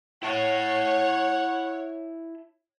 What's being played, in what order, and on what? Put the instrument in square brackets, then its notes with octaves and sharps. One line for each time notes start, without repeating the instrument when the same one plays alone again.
[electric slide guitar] E4 A5 [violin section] C#5 [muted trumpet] F#5